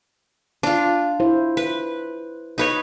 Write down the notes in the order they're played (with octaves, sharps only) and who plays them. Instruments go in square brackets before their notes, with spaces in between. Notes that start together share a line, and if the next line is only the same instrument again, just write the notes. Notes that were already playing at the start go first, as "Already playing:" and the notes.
[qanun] D4 F4
[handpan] E4 C5
[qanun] B4
D#4 B4 C#5